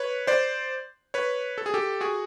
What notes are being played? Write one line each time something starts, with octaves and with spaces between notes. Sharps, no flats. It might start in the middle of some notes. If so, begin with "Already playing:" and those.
Already playing: B4 C#5
C5 D5
B4 C#5
A4
G#4
G4 A4
F#4 G#4